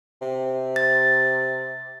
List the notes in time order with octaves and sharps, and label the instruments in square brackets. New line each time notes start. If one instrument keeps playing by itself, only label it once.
[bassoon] C3
[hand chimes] A6